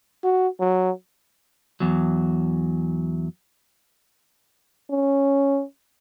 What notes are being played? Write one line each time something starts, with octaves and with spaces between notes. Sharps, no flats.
F#4
F#3
E2 F#3
C#4